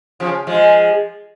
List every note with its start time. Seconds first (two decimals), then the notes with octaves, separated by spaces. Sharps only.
0.20 C#3 F3
0.47 F3 G#3